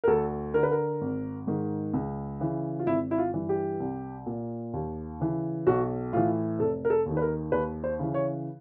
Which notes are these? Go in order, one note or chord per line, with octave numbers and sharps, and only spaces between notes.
A#4
D2 A4
D3 A#4
B4
A#4
G#1
G#2 D#3
C#2
C#3 E3
F4
G#1 E4
E4
F4
G2 E3
G4
C2
A#2
D#2
C#3 E3
B1 F#4
A2 E3 F4
F1 A4
A#4
A4
D#2 D#3
B4
A#4
D#2 B4
C5
C#3 E3
C#5